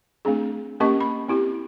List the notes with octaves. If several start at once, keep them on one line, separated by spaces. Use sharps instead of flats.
A3 C4 D4 G#4
A#3 C#4 G4 A#4 D#5 C#6
B5
C4 E4 G4